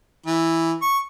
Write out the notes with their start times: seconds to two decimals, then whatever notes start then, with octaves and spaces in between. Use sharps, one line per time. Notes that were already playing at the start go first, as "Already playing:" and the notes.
0.26 E3
0.82 C#6